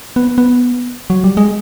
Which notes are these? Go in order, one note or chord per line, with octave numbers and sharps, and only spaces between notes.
B3
B3
F#3
G3
G#3